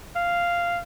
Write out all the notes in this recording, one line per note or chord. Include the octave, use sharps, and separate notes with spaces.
F5